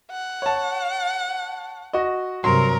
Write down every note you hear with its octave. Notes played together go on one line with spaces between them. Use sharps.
F#5
C#5 A5
F#4 D#5
G2 C3 F#3 A#4 C6